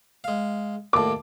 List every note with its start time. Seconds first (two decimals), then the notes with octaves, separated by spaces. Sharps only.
0.24 G#3 F5
0.93 D#2 A2 A5 D6